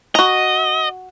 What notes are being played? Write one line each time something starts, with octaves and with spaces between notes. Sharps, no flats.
F#4 D#5 A#5